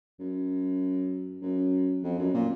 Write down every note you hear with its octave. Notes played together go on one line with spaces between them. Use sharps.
F#2
F#2
F2
F#2
A#2